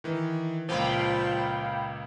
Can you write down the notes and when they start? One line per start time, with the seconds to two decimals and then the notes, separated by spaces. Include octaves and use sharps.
0.04 D#3 E3
0.69 C#2 A#2 F3 F5 G5 B5